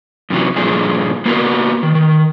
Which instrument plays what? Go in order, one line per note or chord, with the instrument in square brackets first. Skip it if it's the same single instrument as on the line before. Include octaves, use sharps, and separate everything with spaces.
[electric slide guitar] F#2 C3 E3 F#3
G2 A#2 D3 F3 G#4
A#3 B3 E4 F#4 A#4 B4
D#3
D#3